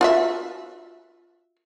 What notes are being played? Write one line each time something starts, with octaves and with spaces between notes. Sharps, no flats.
F4 F#4 E5